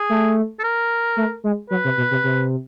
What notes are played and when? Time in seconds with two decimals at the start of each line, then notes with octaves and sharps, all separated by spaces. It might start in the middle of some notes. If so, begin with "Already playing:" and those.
Already playing: G#4
0.09 A3
0.59 A4
0.64 A#4
1.17 A3
1.44 G#3
1.70 F#3 B4
1.84 C3
1.97 B2
2.11 C3
2.24 C3